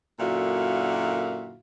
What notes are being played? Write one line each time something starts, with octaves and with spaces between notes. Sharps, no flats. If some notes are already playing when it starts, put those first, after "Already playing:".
F#2 A#2 D3 E4 F#4 F5